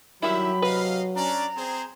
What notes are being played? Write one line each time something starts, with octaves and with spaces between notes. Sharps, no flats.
D#3 F#3 G3 E4 G4 E5 B5
C3 B4 D#5 F5
C#4 D4 D5 A#5
C4 G#4 C5